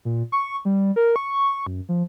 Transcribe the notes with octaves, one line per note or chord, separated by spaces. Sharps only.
A#2
C#6
G3
A#4
C#6
F#2
F3